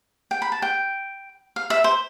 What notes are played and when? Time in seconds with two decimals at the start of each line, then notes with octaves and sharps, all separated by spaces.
0.31 G5
0.42 B5
0.52 A5
0.62 G5
1.56 F5
1.70 E5
1.84 C5